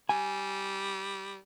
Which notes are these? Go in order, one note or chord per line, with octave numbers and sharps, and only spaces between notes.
G3 G#5